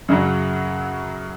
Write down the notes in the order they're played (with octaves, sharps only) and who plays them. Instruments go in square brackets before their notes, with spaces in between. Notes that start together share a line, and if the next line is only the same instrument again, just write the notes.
[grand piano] F#2 C#3 F#3